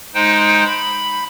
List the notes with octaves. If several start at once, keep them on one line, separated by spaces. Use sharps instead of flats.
G#3 D#4 C5 G5
B5